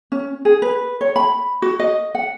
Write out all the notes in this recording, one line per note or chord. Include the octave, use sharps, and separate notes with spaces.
C#4
G#4
B4
C#5
B5
F#4
D#5
F#5